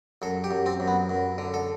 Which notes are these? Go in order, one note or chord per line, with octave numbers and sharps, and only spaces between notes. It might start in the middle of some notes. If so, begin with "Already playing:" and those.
F#2 A4
G4
F#2
C4
F#2
B3
F#2
D3
A4